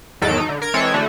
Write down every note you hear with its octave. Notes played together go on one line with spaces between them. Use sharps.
E2 G#2 D#3 F#3 A4 D7
D#4
D3
A#4 G#6 D7
E3 G#3 C4 A4 C#5
D3 A3 F#4